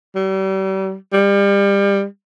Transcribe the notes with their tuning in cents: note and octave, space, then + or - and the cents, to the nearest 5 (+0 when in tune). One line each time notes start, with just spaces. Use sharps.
G3 -40
G3 +30